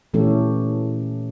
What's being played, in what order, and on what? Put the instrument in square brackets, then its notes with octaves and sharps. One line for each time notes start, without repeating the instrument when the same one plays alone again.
[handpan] A#2 E3 A3 C#4 G4 A4